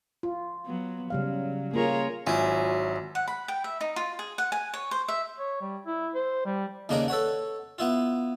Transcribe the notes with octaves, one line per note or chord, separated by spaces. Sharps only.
F4
F#3 B3
C#3 F#3 G3 F5
A#3 F4 G#4 A#4 C#5
G#1 F#3 E4 F4 G#5
F#5
B5
G5
E5
D#4
F4
G#4
F#5
G#5
C#5
C5
E5
C#5
G3
E4
C5
G3
D#2 C#3 A#3 D4 A#4 D#5
A4 B4 C#5 F#5
B3 E4 F4